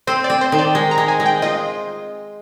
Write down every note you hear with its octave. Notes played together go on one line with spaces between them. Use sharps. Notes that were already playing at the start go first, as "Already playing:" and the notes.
C4 C5
D5
C4
C5
D#3
D5
G#3
A#5
G#3
G#5
G#3
G5
F4 D#5